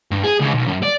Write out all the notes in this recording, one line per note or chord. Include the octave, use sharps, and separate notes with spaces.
G2
G#4
C#2
B1
F#2
D5